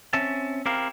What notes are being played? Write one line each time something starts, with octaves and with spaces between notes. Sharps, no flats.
C4 C#4 E5 A5
C4 E4 G4 A#4 F5